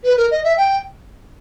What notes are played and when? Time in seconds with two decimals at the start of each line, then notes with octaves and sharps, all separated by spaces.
0.04 B4
0.17 A#4
0.31 D#5
0.44 E5
0.57 G5